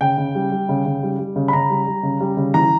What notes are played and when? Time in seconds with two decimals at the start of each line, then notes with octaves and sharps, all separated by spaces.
0.01 C#3 G5
0.18 C#3
0.35 G3
0.52 G3
0.69 C#3
0.86 C#3
1.03 G3
1.19 G3
1.36 C#3
1.48 B5
1.53 C#3 A#5
1.70 G3
1.87 G3
2.03 C#3
2.21 G3
2.37 C#3
2.54 E3 A#5